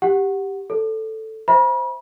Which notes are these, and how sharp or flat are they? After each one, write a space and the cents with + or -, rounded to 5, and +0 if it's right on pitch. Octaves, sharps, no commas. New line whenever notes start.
G4 +0 F#5 +0
A4 +0 C#5 +5
C5 +0 E5 -5 B5 -40